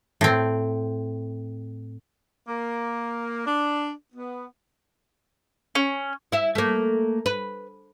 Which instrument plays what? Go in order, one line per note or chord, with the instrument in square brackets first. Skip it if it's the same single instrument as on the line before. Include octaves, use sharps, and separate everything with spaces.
[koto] A2 C4
[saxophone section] A#3
D4
B3
[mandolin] C#4
[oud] E4 E5
A3 A#3
B4